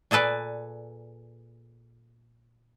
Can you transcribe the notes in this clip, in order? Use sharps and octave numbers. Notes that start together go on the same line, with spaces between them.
A#2 G#4 A4 B4 D5